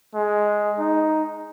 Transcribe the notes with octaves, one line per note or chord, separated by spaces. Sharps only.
G#3
D#4